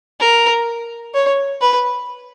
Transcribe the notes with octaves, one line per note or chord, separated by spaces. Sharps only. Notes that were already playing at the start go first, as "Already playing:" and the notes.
A#4
C#5
B4